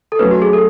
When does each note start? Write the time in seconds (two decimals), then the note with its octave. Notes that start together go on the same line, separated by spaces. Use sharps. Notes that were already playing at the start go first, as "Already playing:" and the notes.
0.12 A4
0.19 F#3 A3 C#4 B4
0.31 F#4
0.42 G#4
0.53 A4